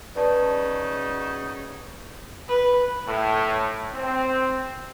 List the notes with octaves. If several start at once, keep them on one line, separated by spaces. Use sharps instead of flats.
C#3 F#3 D#4 B4 D5 A5
B4
A2
C4